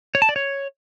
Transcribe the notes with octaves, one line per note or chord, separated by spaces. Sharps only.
C#5
A5
D5
C#5